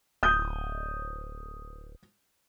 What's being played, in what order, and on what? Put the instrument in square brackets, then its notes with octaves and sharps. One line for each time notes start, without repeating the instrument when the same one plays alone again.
[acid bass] D1 [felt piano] D#6 G6